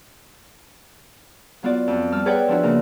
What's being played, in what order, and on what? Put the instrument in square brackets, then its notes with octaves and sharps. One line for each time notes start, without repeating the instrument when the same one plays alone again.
[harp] F#3 B3 F4 F#4 D5
F2
G3 A5 E6 F6
G#4 B4 C#5 D5 F#5 G5
F3 D4 E4 F#4
C#3 A#3 A#4